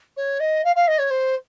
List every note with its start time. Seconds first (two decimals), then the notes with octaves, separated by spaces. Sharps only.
0.17 C#5
0.40 D#5
0.65 F5
0.76 F5
0.88 D#5
0.99 C#5
1.11 C5